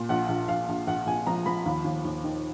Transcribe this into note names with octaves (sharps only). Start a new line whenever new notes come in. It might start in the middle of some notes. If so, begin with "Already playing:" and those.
Already playing: A#2
A#1 F#5
A#1
A#1 F5
A#1
A#1 F#5
A#1 G#5
F3 A#5
F3 B5
D#2
D#2
D#2
D#3